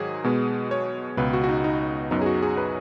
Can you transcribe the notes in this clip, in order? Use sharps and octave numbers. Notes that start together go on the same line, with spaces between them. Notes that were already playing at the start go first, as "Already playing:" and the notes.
Already playing: G#2 D#3 F#3 G#4
B2 G#3 B3
C#5
C#2 B2 B3 B4
F#4
F#4
D#4
D#4
F#2 F#3 B3 D#4
G#4
F#4
G#4
B4